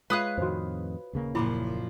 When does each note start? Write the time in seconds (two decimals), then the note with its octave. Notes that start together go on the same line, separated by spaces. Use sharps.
0.10 G#3 F4 B4 C#5 F5 D#6 F#6
0.38 F2 A2 D#3 F#4 C5
1.13 D#1 C#3 A#3
1.35 F#2 A#2 F3 E4 B5 D6